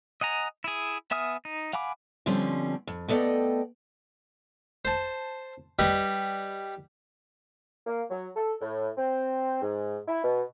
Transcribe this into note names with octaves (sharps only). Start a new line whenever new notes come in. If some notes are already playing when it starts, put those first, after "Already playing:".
D#5 F#5 G#5 A#5
E4 G#4
B3 E5 G#5 D#6 F6
D#4
F5 F#5 G#5 B5 D6
B2 D3 F3 G3 C4 C#4
F2
A3 B3 A4 D5 D#5 G5
C5 A5
G3 B4 D#5
A#3
F#3
A4
A2
C4
G#2
E4
B2